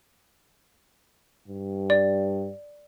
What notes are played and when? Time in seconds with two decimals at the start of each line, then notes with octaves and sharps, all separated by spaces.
1.48 G2
1.90 D5